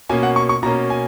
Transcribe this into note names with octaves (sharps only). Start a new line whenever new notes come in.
B2 A#3 C#4 G#5
F#5
C#6
C#6
B2 A#3 C#4 A#5
G#5